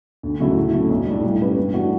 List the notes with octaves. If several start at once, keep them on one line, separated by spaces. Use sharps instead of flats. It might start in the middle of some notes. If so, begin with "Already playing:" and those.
D2
C#3 F#3 A3 E4
A2
F#3 A3 C#4
B1
A2 G3 D4
A2
G3 C#4 G4 B4
G2
E3 A3 D4 F#4